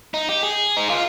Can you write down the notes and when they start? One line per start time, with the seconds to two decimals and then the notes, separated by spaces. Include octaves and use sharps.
0.14 D#4
0.29 G4
0.43 G#4
0.77 D#4
0.90 F4